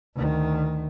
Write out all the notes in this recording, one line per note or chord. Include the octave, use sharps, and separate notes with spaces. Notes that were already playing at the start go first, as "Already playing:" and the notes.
D2 D#3